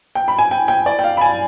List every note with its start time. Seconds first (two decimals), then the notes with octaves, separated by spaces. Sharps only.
0.15 G5
0.28 B5
0.38 G#5
0.51 G5
0.68 G5
0.86 D5
0.99 G5
1.04 F5
1.17 B5
1.21 G#5